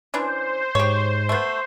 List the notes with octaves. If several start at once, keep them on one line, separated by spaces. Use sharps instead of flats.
E3 C#4 D4 C5
G#2 G4 C#5
A3 B3